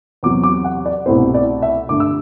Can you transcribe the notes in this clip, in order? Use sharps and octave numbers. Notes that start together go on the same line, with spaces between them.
E2 C3 F#3 D6
D6
F#5
D5
C2 B2 A3 C4 E4 C5
D5
E5
G2 D3 A3 D6
E6